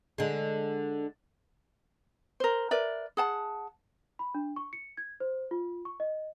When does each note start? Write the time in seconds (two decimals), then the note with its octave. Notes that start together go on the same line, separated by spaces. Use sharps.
0.18 D3 G#3
2.40 A#4 C5
2.71 A#4 B4 D5 E5
3.17 G#4 F#5 A5
4.19 B5
4.35 D4
4.56 C#6
4.73 C#7
4.97 G#6
5.20 C5
5.51 F4
5.85 C#6
6.00 D#5